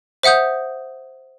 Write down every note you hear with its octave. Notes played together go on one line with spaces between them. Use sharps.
C5 E5 F#5 D#6 G6